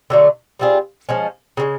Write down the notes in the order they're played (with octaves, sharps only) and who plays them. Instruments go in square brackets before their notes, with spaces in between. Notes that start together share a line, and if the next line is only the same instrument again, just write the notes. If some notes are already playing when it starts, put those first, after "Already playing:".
[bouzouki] D3 F#3 A3
G3 C4 F4 G#4
F3 G#3 C#4
C#3 F3 G#3